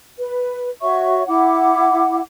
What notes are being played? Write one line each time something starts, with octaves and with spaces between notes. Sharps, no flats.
B4
F#4 C#5 E5 C#6
E4 F#5 D6